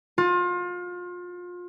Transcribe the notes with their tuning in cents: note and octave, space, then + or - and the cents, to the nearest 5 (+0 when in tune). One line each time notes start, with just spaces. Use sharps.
F4 +30